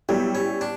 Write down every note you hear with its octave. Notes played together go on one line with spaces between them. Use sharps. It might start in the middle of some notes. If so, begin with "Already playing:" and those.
F#3 G3 B3 E4 G4
C#4
D4